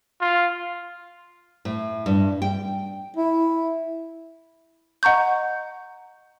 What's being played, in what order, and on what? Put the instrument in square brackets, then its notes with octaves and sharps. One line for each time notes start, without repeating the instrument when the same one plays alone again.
[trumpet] F4
[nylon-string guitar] A2
G2
G5
[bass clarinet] E4
[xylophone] D#5 F#5 A#5 C#6 G6